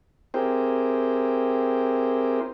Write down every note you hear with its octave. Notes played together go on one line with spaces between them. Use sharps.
C4 E4 G4 G#4 A#4 C5